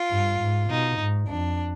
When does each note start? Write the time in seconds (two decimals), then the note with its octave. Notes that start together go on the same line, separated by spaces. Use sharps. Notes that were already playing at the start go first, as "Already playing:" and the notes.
Already playing: F4
0.11 G2
0.40 G#2
0.69 B2 D#4
0.99 G#2
1.29 F2 D4